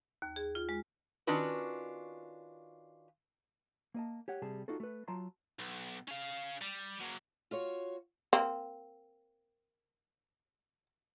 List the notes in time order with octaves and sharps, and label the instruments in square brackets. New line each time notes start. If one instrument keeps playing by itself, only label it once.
[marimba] D#2
G#4
F4
G#3
[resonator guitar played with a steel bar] D#3 C#4 D4 F4 F#4 B4
[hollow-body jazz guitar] A#3 D#5 A5
G4 C#5 F#5
C3 G3 G#4 A5
D#4 F4 F#4 A4
A3 B4
F#3 F4 A5 A#5 C6
[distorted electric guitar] B1
C#4 F5
G3
F#3 A#3
[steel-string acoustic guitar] F4 F#4 C#5
[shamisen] A#3 C4